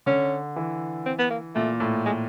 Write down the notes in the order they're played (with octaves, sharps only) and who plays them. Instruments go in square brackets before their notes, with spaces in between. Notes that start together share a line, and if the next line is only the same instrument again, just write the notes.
[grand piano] D3 [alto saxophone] C#4
[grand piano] E3
[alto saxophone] C4
B3
A#3
[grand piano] A#2 [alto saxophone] A3
[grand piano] A2
[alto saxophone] G#3